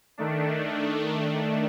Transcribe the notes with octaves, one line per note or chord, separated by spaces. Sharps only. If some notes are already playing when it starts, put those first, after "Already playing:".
D#3 A3 D4